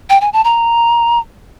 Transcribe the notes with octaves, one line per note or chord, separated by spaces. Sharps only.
G5
G#5
A5
A#5